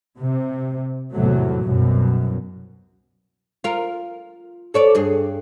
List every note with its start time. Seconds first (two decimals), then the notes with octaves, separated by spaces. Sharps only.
0.17 C3
1.13 G#1 E2 A2 C3 F#3 A3
1.63 C2 F#2 B2
3.64 F4 A#4
4.74 A4 C#5 D5
4.95 G2 G#4